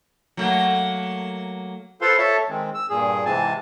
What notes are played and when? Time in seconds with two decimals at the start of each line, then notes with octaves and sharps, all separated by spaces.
0.37 F#3 A3 A#3
2.01 F4 A4 B4 C5 F5 C6
2.18 A4 C#5 E5 A5
2.49 D#3 G#3 C4
2.74 E6
2.89 G2 A#2 G#4
3.25 G#2 C3 E3 C4 G#5 A5